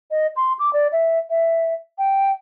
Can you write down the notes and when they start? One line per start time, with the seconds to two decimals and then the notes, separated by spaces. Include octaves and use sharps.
0.11 D#5
0.36 C6
0.59 D6
0.73 D5
0.92 E5
1.30 E5
1.98 G5